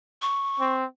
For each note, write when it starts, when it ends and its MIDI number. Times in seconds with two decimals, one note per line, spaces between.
0.22 0.73 85
0.59 0.85 60